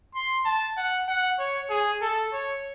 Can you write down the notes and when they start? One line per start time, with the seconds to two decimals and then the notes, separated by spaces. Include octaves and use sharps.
0.15 C6
0.45 A5
0.77 F#5
1.08 F#5
1.39 C#5
1.70 G#4
2.02 A4
2.33 C#5